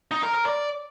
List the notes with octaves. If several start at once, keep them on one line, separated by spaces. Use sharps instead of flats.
D#4
A#4
A#4
D5